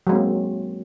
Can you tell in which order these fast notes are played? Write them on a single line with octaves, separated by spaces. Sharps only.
F#3 G#3 C4 A#3